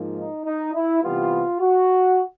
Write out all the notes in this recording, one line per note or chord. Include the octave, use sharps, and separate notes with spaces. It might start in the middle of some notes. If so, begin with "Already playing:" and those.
Already playing: G#2 F3 A#3
D#4
D#4
E4
C3 E3 G3 B3 F4
F#4